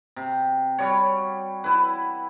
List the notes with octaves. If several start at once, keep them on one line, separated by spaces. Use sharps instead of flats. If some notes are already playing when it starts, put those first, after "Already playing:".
C3
G3 F#4 C#5
E4 B4